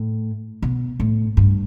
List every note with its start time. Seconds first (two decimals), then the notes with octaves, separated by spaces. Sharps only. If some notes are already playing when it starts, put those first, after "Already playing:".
Already playing: A2
0.62 B2
1.00 A2
1.37 G2